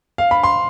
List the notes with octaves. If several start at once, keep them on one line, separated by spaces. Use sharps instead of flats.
F5
B5
C6